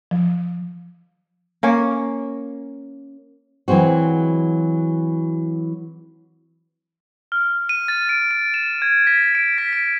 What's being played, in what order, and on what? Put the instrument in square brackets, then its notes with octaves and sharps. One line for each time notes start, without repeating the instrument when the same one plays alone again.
[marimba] F3
[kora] A#3 C#4 A#4 C#5
[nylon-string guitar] E3 F#3 G#3 C4 F#4
[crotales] F6
D#7
A6
D7
D7
E7
G#6
B6
D7
B6
D7